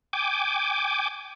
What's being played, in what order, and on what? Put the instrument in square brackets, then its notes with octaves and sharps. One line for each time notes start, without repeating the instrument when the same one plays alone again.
[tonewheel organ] G5 G#5 D6